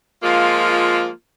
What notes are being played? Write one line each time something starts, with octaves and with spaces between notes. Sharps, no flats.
F3 G#3 A#3 F4